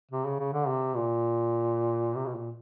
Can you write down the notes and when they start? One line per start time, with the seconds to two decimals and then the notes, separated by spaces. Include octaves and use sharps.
0.11 C3
0.26 C#3
0.39 C#3
0.53 D3
0.68 C3
0.96 A#2
2.16 C3
2.26 B2
2.35 A#2